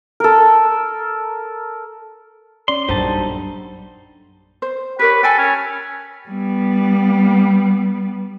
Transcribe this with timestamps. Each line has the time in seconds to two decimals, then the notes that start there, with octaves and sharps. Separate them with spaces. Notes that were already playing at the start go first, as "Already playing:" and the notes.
0.20 A4 A#4
2.68 C#4 D5 C6
2.89 A#1 F#2 G3 D4 D#4 A4 C5
4.62 C5
4.99 G4 A#4 B4 C#5
5.23 A4 G5 G#5 B5
5.38 C#4
6.29 G3 B3